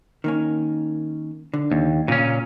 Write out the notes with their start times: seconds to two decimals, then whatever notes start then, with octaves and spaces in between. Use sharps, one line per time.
0.24 D#3 A#3 C#4
1.53 D3
1.71 D#2
2.08 A#2 C#3 C#4